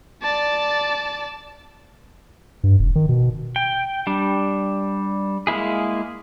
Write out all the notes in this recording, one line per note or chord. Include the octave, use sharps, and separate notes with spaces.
D5 A5
G2
F1
D#3
B2
G5
G3 D4
G#3 A#3 E4 G#4